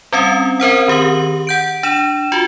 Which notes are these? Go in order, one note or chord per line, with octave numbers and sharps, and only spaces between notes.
G3 C4 C#4 D#6
C4 A#4 C5 F#5
D#3 G4 D#6 F#7
F#5 G6 D7
D4 E7
F4 F#4